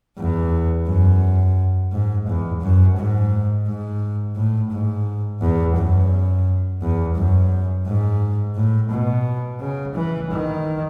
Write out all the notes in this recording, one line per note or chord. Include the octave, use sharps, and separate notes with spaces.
E2
F#2
G#2
E2
F#2
G#2
G#2
A2
G#2
E2
F#2
E2
F#2
G#2
A2
B2
C#3
E3
D#3